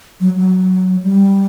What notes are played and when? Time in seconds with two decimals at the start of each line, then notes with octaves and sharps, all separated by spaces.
0.20 F#3
0.38 F#3
1.03 G3